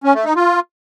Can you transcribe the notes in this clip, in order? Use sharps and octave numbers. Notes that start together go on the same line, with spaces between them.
C#4
A3
D#4
F4